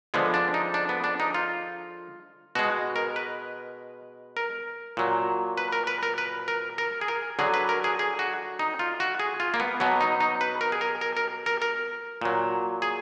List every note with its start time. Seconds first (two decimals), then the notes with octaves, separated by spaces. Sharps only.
0.14 D3 F3 G#3 B3
0.34 D4
0.54 D#4
0.74 D4
0.89 B3
1.04 D4
1.20 D#4
1.34 F4
2.55 B2 G#3 F#4
2.96 A#4
3.16 B4
4.37 A#4
4.97 A#2 F#3
5.58 B4
5.72 A#4
5.87 B4
6.03 A#4
6.18 B4
6.48 A#4
6.78 A#4
7.01 G#4
7.08 A#4
7.39 D3 F#3 G#4
7.54 B4
7.69 A#4
7.84 G#4
7.99 G#4
8.19 F#4
8.59 D#4
8.79 F4
9.00 F#4
9.20 G#4
9.40 F4
9.54 A#3
9.60 B3
9.80 B2 F#3 B3
10.01 D#4
10.21 D#4
10.41 B4
10.61 A#4
10.72 G#4
10.81 A#4
11.01 A#4
11.17 A#4
11.46 A#4
11.62 A#4
12.21 A#2 F#3
12.82 G#4